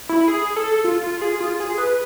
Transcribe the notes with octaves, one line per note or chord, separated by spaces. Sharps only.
E4
G#4
A4
F4
F4
G#4
F4
G#4
B4